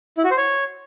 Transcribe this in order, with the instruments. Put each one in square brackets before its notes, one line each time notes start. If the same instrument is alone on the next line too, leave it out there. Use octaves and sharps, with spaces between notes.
[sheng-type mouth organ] E4
F#4
C5
C#5